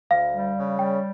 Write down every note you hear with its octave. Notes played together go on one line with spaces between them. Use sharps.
D2 F5
G3
C#3
G3 G5